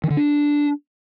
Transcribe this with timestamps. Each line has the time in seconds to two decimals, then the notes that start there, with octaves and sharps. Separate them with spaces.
0.04 D#3
0.10 D3
0.17 D4